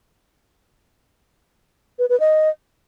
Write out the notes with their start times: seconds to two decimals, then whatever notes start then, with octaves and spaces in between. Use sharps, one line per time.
1.99 B4
2.09 B4
2.20 D#5